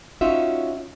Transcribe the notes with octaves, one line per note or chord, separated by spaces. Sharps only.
C#4 D#4 F4 F#4 E5